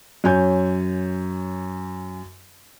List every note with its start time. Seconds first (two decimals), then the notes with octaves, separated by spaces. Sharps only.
0.24 F#2 C#5 G#5 G6